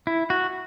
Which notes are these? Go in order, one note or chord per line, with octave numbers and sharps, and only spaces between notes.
E4
F#4